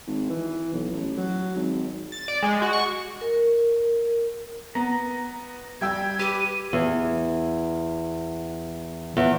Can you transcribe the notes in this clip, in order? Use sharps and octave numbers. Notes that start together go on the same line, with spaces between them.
G#1
E3
B1
A1
F#3
G#1
A6
D5
G#3
F#4
C#6
A#4
B3 A#5
G3 G5 E6 G#6
G4 B4 D#7
E2
E2